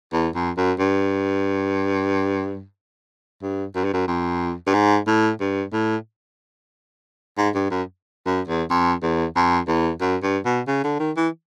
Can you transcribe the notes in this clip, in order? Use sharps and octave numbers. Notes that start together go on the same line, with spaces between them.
E2
F2
F#2
G2
G2
F#2
G2
F#2
F2
G2
G#2
A2
G2
A2
G#2
G2
F#2
F#2
E2
F2
E2
F2
E2
F#2
G2
B2
C#3
D3
D#3
E3